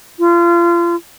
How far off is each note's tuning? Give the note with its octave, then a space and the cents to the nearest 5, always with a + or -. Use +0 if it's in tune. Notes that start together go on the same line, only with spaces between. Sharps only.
F4 -30